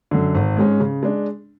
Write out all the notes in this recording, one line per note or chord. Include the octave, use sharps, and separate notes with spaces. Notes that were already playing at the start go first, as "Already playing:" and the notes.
F#2 D3
G#1
G#2 G#3 C#4
C#3
G#3 D4